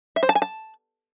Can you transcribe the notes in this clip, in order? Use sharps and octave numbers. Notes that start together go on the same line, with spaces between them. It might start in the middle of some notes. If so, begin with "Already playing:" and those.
E5
C5
A5
G#5
A5